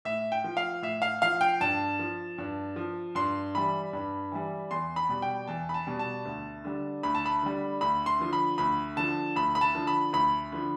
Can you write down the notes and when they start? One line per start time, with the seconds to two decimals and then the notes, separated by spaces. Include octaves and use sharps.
0.05 A2 E5
0.32 G5
0.44 F3
0.57 F5
0.82 A2 E5
1.02 F5
1.22 F3 F5
1.41 G5
1.60 G2 A5
1.99 F3
2.38 G2
2.76 F3
3.15 G2 C6
3.55 E3 G3 B5
3.93 G2
4.32 E3 G3
4.71 E2 C6
4.96 B5
5.09 B2 G3
5.22 G5
5.48 E2 A5
5.69 B5
5.74 A5
5.87 B2 G3
5.99 A5
6.25 D2
6.65 D3 G3
7.03 D2 B5
7.15 A5
7.25 B5
7.43 D3 G3
7.81 D2 B5
8.06 C6
8.20 D3 F3
8.33 B5
8.58 D2 B5
8.96 D3 F3 A5
9.35 D2 B5
9.55 B5
9.61 A5
9.75 D3 F3
9.87 B5
10.13 D2 B5
10.52 D3 F3